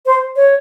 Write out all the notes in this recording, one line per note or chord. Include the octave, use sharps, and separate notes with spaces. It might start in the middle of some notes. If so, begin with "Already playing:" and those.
C5
C#5